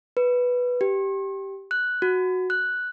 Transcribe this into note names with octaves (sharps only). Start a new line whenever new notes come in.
B4
G4
F#6
F#4
F#6